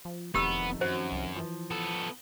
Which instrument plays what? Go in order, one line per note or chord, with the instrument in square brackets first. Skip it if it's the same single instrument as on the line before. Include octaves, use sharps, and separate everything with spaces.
[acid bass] F3
[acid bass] E1 [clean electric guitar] F2 D#3 A3 [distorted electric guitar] B3 [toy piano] G4 E6
[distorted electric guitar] F#2 [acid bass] F#4 [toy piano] C5
[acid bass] C2
[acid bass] E3 [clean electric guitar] F3
[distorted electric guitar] B3 A4